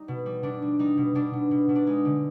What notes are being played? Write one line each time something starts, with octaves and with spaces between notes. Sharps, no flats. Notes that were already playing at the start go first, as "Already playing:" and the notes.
Already playing: G3 D#4
B2
G3
B2 D4
G3
G3 D#4
B2
B2 D4
B2
B2
B2
D4
G#3 D#4
D3